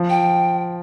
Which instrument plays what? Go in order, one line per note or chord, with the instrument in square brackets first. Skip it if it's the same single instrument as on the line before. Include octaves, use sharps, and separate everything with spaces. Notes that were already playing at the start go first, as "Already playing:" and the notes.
Already playing: [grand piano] F3
[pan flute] G5